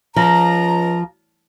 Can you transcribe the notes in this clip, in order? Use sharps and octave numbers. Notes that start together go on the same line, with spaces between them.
C#2 F3 A#5